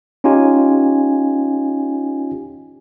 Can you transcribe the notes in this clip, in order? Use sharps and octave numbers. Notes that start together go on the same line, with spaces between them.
C#4 D#4 F4 G4 G#5